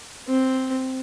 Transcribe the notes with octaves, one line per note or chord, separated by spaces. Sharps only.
C4